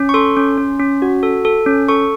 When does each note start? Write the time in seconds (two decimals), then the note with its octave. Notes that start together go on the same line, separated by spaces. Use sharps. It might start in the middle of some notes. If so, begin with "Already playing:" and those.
Already playing: C#4
0.09 C#6
0.14 A4 C6
0.37 C#4
0.57 C#4
0.80 C#4
1.02 F#4
1.23 A4
1.45 A4
1.66 C#4
1.88 A4 C#6